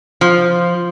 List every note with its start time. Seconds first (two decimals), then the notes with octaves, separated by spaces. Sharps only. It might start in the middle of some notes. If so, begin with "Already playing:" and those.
0.21 F3